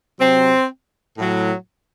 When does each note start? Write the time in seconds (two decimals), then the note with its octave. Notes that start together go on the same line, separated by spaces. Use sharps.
0.20 C3 F#3 C4
1.18 A2 F#3